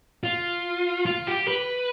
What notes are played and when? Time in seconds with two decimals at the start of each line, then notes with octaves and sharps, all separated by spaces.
0.24 F4
1.06 F4
1.27 G4
1.48 B4